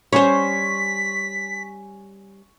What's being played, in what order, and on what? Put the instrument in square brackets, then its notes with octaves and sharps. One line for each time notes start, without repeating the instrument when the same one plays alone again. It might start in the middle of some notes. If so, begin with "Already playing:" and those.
[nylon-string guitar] G3 C#4 [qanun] C5 C#5 [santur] G#5 C#6 [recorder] B6